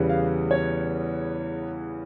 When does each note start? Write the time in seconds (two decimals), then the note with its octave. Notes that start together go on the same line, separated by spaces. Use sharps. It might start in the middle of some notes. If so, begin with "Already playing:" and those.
Already playing: E2 C#3 E3 G3 B3
0.09 F5
0.51 C#5